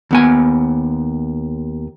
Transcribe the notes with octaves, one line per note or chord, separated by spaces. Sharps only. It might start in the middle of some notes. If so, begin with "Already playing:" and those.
D#2 B3 G#5